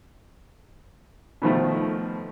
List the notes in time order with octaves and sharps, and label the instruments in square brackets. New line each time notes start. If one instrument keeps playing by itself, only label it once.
[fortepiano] B2 D#3 F3 A3